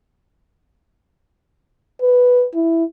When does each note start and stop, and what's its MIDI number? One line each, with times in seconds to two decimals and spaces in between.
2.02 2.45 71
2.54 2.84 64